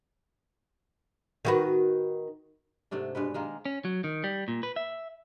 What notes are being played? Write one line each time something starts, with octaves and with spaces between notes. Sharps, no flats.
D#3 F#4 B4
G#2 C3 A3 D4
G2 B2 G#3 B4
D#3 G#3 A#3
C#4
F#3
D#3
G3
A#2
B4
E5